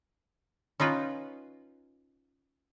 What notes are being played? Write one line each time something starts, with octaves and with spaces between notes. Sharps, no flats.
C#4 D#4 F4 B4